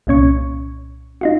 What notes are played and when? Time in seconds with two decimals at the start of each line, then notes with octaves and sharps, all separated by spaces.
0.07 C2 A#2 C#4 C#6
1.21 D#4 F4 F#4